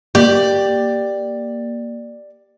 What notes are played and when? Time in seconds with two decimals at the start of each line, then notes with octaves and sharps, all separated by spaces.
0.15 A#3 G4 D5